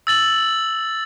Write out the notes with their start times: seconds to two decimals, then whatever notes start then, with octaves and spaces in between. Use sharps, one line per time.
0.07 E6 A6 F#7